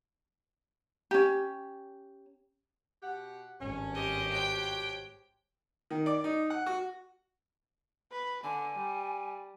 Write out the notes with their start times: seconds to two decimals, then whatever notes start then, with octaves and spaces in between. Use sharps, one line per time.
1.11 C#4 G4
3.02 B2 G4 F#5
3.61 G#1 G2 C#4
3.94 G4 C5 D#5
4.32 B2 F#4 C#5 G5
5.91 D#3
6.06 D5
6.24 D#4
6.50 F#5
6.66 F#4
8.12 B4
8.44 D3 G#5
8.75 G3